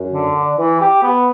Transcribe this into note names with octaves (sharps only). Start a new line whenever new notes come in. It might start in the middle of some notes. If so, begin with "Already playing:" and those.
Already playing: F#2
D3
D4
E3
G4
B3